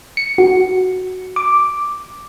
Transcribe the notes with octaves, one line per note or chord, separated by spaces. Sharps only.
C#7
F#4
D6